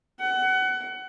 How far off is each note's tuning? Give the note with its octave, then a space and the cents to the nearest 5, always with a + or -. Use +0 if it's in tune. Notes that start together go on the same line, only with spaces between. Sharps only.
F#5 +25